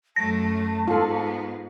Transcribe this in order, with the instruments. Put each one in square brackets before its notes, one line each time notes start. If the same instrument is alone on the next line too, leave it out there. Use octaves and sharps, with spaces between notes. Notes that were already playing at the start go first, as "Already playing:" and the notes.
[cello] F#2 A3 [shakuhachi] A5 [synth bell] A#6
[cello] G#2 B3 [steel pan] F4 A4